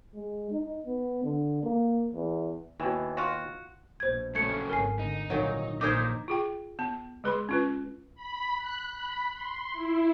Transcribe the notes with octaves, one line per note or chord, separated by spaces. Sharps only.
G#3
D#4
B3
D3
A#3
E2
D#2 B2 E3
F4 F#4
A#1 B2 C5 G#6
F#2 C#3 A3 G#6 C#7
G#1 A#4 G#5 C7
D3 D#4
C2 A#2 D#3 F#3
A#1 A#2 D#4 A#4 C5 D6 D#6 G#6
F4 G#4 G5
B3 A5
G#3 G#4 B4 B5 C6
C#4 F4 B4
B5
F#6
B5
C6
E4